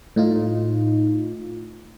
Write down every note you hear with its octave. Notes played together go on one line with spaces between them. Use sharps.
A2 D#4 F4